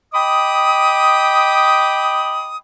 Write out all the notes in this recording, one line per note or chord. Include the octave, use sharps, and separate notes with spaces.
D#5 G5 B5 D6 D#6